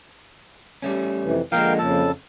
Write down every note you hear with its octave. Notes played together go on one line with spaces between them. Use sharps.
G3 A3 C#4
F2 C3 E3
D3 F3 G#3 A#3 A#4 F5 G5
F2 C#3 A4 A5